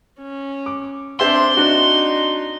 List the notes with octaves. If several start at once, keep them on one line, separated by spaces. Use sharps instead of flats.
C#4
D6
C4 D4 C5 E5 C6
D4 D#4 F#4